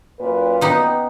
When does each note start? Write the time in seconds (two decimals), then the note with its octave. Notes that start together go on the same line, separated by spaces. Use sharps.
0.20 F#2 A#2 B4
0.61 B3 D#4 G4